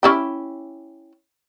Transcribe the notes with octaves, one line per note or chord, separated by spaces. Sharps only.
C#4 E4 G4